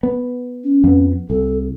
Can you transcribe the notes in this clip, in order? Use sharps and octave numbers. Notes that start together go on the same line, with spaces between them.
B3
C#4
F2 B3
C2 A4